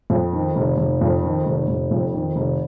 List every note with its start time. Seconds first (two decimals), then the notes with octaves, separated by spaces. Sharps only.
0.10 F2
0.33 D#3
0.56 F1
0.78 F1
1.01 F2
1.23 D#3
1.46 F1
1.68 F1
1.91 F2
2.14 D#3
2.36 F1